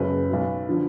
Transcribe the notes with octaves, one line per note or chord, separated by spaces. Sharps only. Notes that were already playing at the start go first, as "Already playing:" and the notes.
Already playing: F#1 F#2 C#3 B4
B1 B2
D3 F3